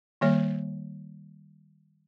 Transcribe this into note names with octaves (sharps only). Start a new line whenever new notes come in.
D#3 G3 A#3 C#5